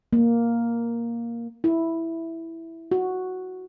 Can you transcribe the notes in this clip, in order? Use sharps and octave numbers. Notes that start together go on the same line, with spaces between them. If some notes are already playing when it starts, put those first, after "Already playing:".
A#3
E4
F#4